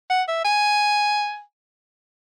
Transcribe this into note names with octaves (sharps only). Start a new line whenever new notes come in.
F#5
E5
G#5